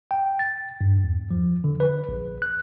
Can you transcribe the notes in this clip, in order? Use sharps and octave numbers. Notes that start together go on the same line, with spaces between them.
G5
A6
G2
E2
F3
D3
B4
A#1
F#6